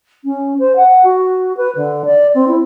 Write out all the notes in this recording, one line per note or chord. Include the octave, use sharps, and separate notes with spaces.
C#4
C5
F#5
F#4
B4
D3
D5
C4
E4